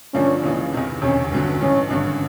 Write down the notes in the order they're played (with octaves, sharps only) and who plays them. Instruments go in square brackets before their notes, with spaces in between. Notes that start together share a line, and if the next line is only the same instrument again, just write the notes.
[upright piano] G2 D3 F3 A#3 D4 [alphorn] C#4
[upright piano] C#2 C#3 E3
E2 C3 D#3
[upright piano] E1 D2 C3 [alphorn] C#4
[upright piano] G1 G2 D3 F#3
[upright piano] A1 G2 E3 [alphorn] C#4
[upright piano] G#1 G2 D3